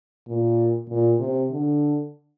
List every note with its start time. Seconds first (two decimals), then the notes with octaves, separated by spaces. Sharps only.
0.27 A#2
0.89 A#2
1.20 C3
1.51 D3